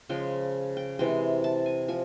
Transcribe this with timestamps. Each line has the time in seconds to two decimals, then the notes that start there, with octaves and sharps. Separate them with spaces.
0.09 C#3 F3 G#3 G5
0.77 G5
0.99 C3 E3 G#3 G5
1.44 A5
1.66 G#5
1.88 F3 G#5